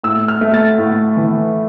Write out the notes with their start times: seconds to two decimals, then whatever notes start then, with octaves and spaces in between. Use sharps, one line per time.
0.03 A2 E6
0.28 F6
0.41 A3
0.54 A6
0.78 A2
1.17 E3